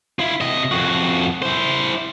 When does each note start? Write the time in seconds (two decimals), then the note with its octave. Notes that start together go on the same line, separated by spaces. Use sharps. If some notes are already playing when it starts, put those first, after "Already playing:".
0.19 E4 F4
0.41 C3 D#5
0.72 F2 F#4
1.42 E4 C5